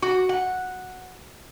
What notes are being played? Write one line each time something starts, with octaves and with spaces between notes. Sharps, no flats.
F#4
F#5